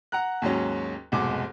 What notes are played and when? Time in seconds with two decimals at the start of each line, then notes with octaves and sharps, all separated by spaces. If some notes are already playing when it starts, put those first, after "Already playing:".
0.12 F#5 A#5 F#6
0.42 D#2 G#2 F#3 C#4
1.12 F1 B1 G#2 F#5 D6